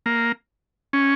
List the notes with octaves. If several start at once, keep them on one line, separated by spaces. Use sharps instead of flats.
A#3
C#4